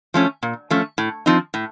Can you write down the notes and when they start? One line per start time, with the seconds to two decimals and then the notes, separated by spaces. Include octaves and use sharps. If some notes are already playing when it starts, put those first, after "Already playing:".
0.14 F3 A3 C#4
0.43 A#2
0.70 F3 A3 C#4
0.98 A2
1.26 F3 C4 D#4
1.54 A2